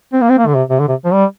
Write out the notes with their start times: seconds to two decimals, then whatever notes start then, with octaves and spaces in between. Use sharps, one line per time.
0.13 C4
0.22 A#3
0.30 C4
0.38 A#3
0.47 D3
0.55 C3
0.70 C3
0.80 D3
0.88 C3
1.05 F3
1.13 G3